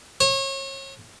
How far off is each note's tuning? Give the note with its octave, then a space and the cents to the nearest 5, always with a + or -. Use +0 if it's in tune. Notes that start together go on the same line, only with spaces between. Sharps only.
C#5 -35